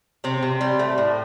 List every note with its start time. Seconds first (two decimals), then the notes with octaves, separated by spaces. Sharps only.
0.24 C3 C4
0.43 C3
0.61 G3
0.79 A3
0.98 A2